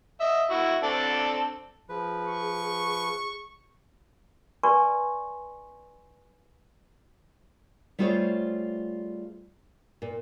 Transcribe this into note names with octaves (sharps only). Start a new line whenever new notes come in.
D#5 E5
E4 F#4
C4 D4 A4
F3 G#4 B4
C#6
B4 D5 G#5 C6 C#6
G3 A3 F4 G#4 C5 C#5
A#2